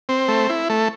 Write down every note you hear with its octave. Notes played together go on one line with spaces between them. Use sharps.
C4
A3
E4
A3